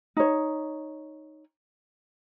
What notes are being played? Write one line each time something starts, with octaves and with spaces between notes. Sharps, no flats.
D#4 C#5